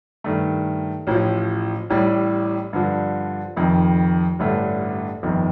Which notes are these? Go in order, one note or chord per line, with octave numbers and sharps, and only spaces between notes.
G2 D#3 A3
A1 A2 F3
A1 A2 G3
G2 D3 F3
F1 F2 D#3
A1 G2 D3 A3
G1 F2 D#3